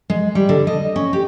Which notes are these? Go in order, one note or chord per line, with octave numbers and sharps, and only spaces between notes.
G#3
G3
D3
D#5
C#4
G4